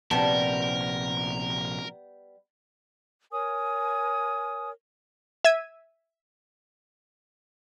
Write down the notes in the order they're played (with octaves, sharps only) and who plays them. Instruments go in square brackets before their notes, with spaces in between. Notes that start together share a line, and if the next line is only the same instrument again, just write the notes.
[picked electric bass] A#1 C3 [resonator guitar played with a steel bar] G3 B3 A5 [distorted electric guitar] A#4
[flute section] A#4 C#5 G#5 D#6
[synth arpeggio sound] E5 E6 G#6 D#7